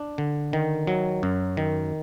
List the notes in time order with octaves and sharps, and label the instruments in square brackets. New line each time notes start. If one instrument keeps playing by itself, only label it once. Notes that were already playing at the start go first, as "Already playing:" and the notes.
Already playing: [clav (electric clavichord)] D4
D3
D#3
F#3
F#2
D#3